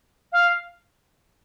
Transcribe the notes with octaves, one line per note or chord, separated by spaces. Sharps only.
F5